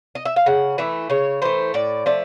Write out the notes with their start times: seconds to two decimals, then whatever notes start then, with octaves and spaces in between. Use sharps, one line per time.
0.15 D#5
0.25 E5
0.36 F5
0.46 C#3 F#5
0.78 E3 A3 E5
1.10 C#3 C#5
1.42 E3 A3 C5
1.74 A2 D5
2.06 F3 A3 D5